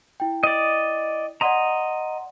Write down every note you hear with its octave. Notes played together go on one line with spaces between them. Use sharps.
E4 G5
D5 D#5
D5 D#5 F#5 A#5 C6